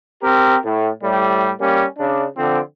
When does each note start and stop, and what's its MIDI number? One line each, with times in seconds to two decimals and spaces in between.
0.23 0.56 60
0.23 0.56 67
0.23 0.56 70
0.64 0.89 45
1.03 1.51 45
1.03 1.51 55
1.60 1.84 55
1.60 1.84 58
1.60 1.84 61
1.98 2.26 49
1.98 2.26 62
2.36 2.60 50
2.36 2.60 53
2.36 2.60 60